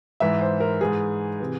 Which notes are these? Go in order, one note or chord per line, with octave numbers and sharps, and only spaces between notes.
G#2 E3 E5
C5
A#4
G#2 E3 G#4
C3 E3